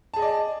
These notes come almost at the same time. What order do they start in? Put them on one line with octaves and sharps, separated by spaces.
A5 G#4 D#5 D5